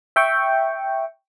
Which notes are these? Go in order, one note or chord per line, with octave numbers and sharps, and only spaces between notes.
E5 G5 C#6